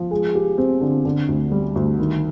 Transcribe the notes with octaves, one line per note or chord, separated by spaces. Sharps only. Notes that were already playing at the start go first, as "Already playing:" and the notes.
Already playing: F3
G#3
G4
C4
D3
D3
D2
G3
D2
D#3